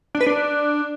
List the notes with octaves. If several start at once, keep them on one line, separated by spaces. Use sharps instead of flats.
D4
B4
D4